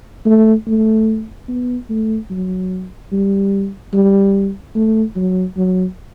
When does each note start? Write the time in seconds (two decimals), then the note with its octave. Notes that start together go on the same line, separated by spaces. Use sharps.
0.26 A3
0.67 A3
1.48 B3
1.89 A3
2.30 F#3
3.12 G3
3.93 G3
4.75 A3
5.16 F#3
5.57 F#3